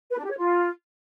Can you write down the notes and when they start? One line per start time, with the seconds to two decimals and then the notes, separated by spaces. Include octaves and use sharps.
0.11 B4
0.17 D4
0.24 G4
0.30 C#5
0.37 F4